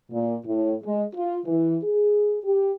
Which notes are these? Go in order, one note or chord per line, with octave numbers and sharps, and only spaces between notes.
A#2
A2
G#3
F4
E3
G#4
G4